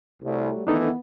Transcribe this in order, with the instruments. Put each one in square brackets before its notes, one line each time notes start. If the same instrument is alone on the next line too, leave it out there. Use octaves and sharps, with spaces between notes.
[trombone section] C2 [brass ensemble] F#3 G3 A3
[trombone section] D#3 E3 A3 [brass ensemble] B3 [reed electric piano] D4 D#4 A4